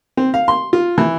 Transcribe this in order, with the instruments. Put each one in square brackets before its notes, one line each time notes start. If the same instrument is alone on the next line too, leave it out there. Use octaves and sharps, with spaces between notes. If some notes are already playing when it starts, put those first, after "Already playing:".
[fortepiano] C4
F5
C6
F4
E3